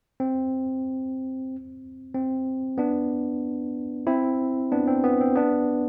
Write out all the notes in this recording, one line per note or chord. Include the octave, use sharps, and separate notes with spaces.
C4
C4
B3 D4
C4 E4
B3 D4
C4
B3
C4
B3 D4